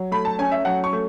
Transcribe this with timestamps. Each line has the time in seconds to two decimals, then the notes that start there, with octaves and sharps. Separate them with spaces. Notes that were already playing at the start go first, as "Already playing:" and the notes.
Already playing: F#3
0.12 A3 B5
0.25 A5
0.38 C#4 G#5
0.51 E5
0.65 F#3 F#5
0.84 C#6
0.93 A3